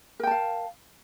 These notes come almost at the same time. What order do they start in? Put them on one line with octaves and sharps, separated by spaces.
A#4 G5 A5 F5